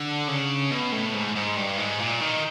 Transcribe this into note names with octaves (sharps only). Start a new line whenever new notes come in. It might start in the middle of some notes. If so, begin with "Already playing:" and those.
Already playing: D3
C#3
B2
A2
G#2
G#2
G2
G#2
A#2
D#3